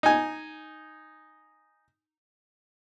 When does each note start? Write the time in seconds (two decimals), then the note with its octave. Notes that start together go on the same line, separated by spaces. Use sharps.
0.03 D#4 G#5